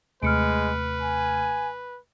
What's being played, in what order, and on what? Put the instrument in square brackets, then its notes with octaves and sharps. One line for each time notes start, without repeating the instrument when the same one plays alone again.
[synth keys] D#2 C3 A3 [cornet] G#3 [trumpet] B4 [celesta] F6 C#7 D7
[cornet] G#5